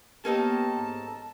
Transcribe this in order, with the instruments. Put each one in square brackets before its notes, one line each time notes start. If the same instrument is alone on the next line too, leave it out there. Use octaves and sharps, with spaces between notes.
[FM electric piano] A#3 B3 [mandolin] C#4 D#4 A4 [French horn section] G4 [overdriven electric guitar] A5
[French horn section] G#2